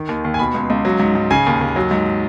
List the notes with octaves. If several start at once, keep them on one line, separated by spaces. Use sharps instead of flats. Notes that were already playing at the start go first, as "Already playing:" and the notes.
Already playing: D#3
D#2
D#2
G#5
B2 B5
C#2
C#2
F#3
G#2
G#2
C#3 G#5
D#2
D#2
F#3
G#2